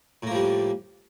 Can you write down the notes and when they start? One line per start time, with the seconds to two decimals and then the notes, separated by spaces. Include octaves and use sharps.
0.23 A2
0.27 A#3
0.31 F3
0.35 G3